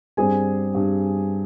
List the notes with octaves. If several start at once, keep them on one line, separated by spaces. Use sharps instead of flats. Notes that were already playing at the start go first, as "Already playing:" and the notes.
G2 G3 C4 G#4 G#5
G2 G3 C4